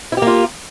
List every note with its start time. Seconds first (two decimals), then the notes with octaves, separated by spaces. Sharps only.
0.12 E4
0.17 G4
0.22 A#3
0.27 F4